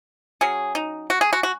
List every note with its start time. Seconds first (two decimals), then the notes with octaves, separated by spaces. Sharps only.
0.41 F#3 C#4 G#4
0.75 D#4
1.10 F#4
1.21 G#4
1.33 F#4
1.43 F#4